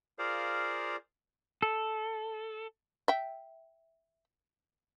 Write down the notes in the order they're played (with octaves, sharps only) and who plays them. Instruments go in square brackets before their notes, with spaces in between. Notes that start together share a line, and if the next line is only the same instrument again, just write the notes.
[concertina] F4 G#4 A#4 C5 D5 F5
[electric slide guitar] A4
[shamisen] E5 G5